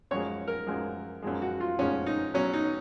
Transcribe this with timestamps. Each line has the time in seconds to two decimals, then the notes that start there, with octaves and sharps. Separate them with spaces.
0.11 F#2 F3 G#3 C#5
0.48 A#4
0.67 F#2 F3 G#3
1.22 F#2 F3 G#3
1.42 F#4
1.60 F4
1.79 F#2 F3 G#3 C#4
2.06 D#4
2.34 B2 F#3 C#4
2.53 D#4